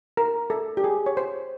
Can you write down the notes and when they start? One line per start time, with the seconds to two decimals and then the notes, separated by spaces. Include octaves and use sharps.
0.17 A#4
0.50 A4
0.77 G4
0.84 G#4
1.06 C#5
1.17 C5